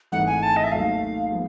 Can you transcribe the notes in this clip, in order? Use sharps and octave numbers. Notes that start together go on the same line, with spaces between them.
G#1 G#2 E3 A3 F#5
G#5
A5
D#5
E5
D#2 D#3 F#3 A3 F5
F3 G#3 B3